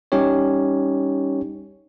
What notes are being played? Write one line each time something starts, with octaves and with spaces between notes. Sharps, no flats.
G3 C#4 D#4 G4 C#5